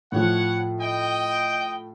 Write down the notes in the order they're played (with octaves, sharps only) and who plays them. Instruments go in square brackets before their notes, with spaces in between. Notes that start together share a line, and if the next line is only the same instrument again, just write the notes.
[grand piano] A2 F3 [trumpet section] C#5 F#5
[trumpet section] D#5 G5